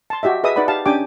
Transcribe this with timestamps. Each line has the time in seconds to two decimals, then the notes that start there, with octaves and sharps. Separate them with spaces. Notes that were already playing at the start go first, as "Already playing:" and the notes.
0.10 A5 C6
0.23 F#4 G4 D#5 E5
0.44 G#4 B4 D#5 E5 D#6
0.56 D#4 B4 D5 F#5 B5
0.68 G4 F5 A5
0.86 C#4 D4 G4 G5 G#5 D6